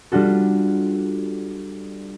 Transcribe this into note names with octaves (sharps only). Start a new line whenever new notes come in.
G3 D4 F4 F#4 A4